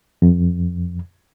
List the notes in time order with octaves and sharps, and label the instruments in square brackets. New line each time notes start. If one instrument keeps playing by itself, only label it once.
[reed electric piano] F2